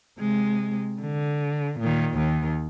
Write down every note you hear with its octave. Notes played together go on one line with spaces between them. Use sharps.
C3 G#3
D3
A#2 D#3
D#2 D#3